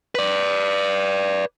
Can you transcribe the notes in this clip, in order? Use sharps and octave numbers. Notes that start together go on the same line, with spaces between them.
B4 D5